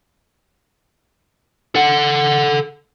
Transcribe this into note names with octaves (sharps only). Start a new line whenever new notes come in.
A4 F#5